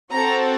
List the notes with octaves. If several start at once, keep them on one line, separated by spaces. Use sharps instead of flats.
C4 F#4 A4 A#5